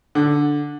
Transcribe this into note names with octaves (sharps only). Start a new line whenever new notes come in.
D3